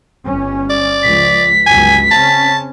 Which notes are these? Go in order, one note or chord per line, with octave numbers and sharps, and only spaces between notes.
G1 G3 C#4
D5
C#2 F3 B6
G1 C#2 F#3 G#5
C#3 C4 C#4 A5